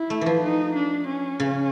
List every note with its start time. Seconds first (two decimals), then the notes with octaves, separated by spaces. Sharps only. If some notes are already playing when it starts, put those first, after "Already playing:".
Already playing: E4
0.10 A3
0.21 E3 F3
0.42 D#4
0.75 D4
1.07 C#4
1.40 C#3